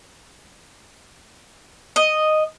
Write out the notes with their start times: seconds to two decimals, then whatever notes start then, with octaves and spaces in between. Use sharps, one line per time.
1.96 D#5